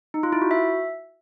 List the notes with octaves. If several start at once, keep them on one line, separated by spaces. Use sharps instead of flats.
D#4
F4
E4
F#4
E5